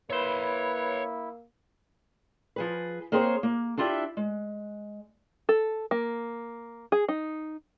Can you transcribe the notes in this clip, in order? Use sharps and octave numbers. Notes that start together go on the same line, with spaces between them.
A#3 E4 B4 C#5 C6
F3 G#4 B4
A#3 C4 G#4 A4 C5 C#5
A#3
D4 E4 F4 G4 E5
G#3
A4
A#3
G#4
D#4